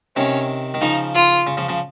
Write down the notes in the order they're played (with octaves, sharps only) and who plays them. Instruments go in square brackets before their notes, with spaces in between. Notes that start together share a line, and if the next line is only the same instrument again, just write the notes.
[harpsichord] C3 D#3 [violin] C#4
[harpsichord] D#3
[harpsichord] C#3 F3 [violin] D#4
[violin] F4
[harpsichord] C#3
C#3 F3
C#3 F3